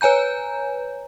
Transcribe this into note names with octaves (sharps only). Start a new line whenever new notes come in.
B4 C#5 G#5 A#5 G6